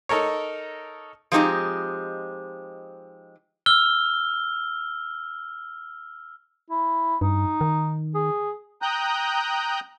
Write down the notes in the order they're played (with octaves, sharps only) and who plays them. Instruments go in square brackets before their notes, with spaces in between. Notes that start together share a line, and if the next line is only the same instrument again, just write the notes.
[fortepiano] D#4 A4 A#4 C#5
[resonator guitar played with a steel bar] F3 G#3 C4 D#4 G4 D#5
[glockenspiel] E6 F6 G7
[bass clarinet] E4
[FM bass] G2 [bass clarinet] D#4
[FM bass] D#3
[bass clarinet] G#4
[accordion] G5 A#5 D#6 F#6 G6